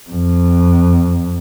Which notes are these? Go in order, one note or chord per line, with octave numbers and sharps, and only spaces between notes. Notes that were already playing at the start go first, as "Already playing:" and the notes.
F2